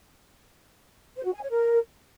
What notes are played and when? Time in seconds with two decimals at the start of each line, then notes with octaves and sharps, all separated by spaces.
1.16 C5
1.24 F#4
1.33 G#5
1.42 C#5
1.50 A#4